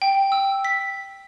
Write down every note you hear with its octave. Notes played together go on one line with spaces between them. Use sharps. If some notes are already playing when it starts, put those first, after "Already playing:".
G5
E6
B6